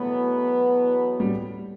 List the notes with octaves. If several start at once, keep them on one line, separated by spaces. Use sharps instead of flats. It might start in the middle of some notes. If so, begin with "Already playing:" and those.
Already playing: E2 B2 F#3 A3 B3
G3